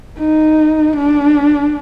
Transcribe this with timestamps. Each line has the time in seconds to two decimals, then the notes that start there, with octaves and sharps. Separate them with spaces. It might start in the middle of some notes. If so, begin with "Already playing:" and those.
0.19 D#4
0.97 D4